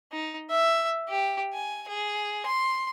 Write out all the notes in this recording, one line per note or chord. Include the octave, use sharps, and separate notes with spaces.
D#4
E5
G4
G#5
G#4
C6